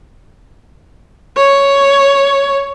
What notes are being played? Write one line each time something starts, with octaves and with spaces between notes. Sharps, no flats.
C#5